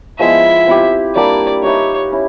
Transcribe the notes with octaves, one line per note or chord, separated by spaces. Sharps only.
F3 G#3 B3 E4 E5
C4 E4 G4
G3 A#3 D4 G4 D5
D#4 G4 B4 C#5 E5
C#4 E4